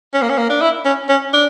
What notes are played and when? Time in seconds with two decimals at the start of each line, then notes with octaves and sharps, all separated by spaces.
0.14 C#4
0.22 A#3
0.29 C#4
0.38 A#3
0.50 D4
0.62 E4
0.85 C#4
1.09 C#4
1.33 D4